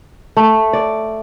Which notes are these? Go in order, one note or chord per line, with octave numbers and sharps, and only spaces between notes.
A3
D5